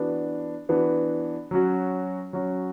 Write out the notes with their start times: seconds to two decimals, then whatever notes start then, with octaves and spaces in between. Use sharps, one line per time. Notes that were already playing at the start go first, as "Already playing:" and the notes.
Already playing: E3 B3 D4 F#4
0.69 E3 B3 D4 F#4
1.51 F#3 C#4 F#4
2.33 F#3 C#4 F#4